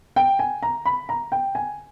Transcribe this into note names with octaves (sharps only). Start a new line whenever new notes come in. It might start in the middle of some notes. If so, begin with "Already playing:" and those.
G5
G#5
A#5
B5
A#5
G5
G#5